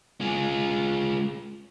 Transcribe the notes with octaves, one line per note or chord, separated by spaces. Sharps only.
G#3 F4